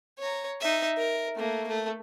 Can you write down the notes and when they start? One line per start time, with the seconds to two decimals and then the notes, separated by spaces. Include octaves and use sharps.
0.19 C#5 A#5
0.61 D#4 E5
0.98 A#4
1.36 A3 A#3
1.67 A3